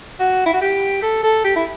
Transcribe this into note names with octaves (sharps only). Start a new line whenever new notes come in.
F#4
E4
F#4
G4
A4
A4
G4
E4